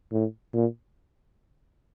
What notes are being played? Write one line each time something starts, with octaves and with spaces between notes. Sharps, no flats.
A2
A#2